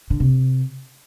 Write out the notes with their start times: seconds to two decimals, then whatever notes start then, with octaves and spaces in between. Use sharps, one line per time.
0.10 D3
0.20 C3